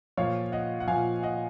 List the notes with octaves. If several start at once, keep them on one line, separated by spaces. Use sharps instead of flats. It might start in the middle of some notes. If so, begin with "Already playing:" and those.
A#2 F3 C#5 F5
D#5 F#5
F#5
A#2 F3 F5 G#5
D#5 F#5